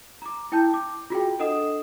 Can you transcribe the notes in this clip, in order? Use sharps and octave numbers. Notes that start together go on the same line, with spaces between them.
A#5 D6
E4 G5 A5 G6
D6
F4 F#4 G#4 G5
D4 A4 D#5 F#5 D#6 E7